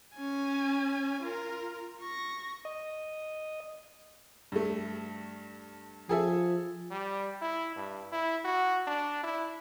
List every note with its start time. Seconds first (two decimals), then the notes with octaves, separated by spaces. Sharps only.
0.16 C#4 G#5
1.23 F4 A#4
2.01 C#6 A#6
2.65 D#5
4.52 G2 A3
6.09 F3 G#4 A4 E5
6.91 G3
7.42 E4
7.76 G2
8.12 E4
8.45 F#4
8.87 D4
9.23 E4